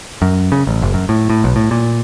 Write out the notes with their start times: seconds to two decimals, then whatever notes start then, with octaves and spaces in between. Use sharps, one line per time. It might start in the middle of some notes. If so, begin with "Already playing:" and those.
0.22 F#2
0.52 C#3
0.67 A1
0.82 F#1
0.94 F#2
1.09 A2
1.30 A2
1.44 B1
1.56 A2
1.71 A#2